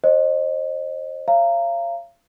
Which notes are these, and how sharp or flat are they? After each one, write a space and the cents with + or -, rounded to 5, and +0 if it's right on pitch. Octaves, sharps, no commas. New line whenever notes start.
C5 +30 D#5 -20
C#5 -20 F5 -35 A#5 -15